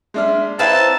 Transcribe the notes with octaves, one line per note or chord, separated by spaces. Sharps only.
G#3 D4 E5 F6
C4 D#4 E4 B4 C#5 F5 A5 B5